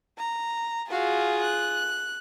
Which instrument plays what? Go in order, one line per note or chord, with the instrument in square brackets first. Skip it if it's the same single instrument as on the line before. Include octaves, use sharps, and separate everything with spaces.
[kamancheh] A#5
[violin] F4 G#4 [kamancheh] F#4 F5
[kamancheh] F#6